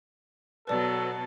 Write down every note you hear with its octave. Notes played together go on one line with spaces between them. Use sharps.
B2 F#3 B3 A4 B4 D5 A5